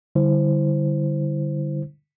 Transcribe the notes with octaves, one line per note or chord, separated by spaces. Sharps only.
D3 G3 E4 C5